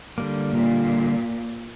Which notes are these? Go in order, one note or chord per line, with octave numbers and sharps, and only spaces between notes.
D3 G3 A#3
A#2